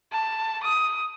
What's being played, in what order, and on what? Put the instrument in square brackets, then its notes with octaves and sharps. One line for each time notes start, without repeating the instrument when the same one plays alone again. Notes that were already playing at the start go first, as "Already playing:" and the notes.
[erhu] A5
D#6